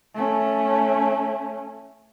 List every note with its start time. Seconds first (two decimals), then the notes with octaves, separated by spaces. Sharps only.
0.14 A3 C#4